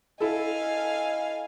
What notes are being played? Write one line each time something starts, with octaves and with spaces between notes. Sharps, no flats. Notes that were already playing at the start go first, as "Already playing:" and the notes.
E4 A4 D#5 F5 G#5